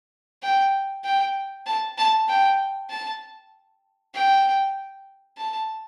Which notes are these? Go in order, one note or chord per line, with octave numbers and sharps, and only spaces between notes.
G5
G5
A5
A5
G5
A5
G5
A5